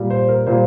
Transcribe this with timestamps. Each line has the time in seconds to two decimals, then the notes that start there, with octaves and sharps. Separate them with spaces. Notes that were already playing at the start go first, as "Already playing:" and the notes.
Already playing: A#2 G3
0.10 C5
0.29 A#4
0.47 A#2 G3 C5